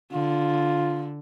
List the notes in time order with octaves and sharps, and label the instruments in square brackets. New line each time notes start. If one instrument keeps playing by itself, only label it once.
[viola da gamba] D3 [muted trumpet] F4